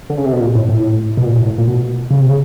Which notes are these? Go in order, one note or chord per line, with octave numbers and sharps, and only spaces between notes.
D3
C#3
C3
B2
A#2
A2
A2
B2
A#2
A2
A2
A#2
B2
C#3
C3
C#3